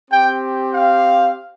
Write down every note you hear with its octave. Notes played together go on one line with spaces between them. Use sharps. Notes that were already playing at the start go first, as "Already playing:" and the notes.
C4 G4 G5
F5